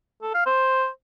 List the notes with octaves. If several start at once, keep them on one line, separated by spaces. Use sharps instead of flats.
A4
F5
C5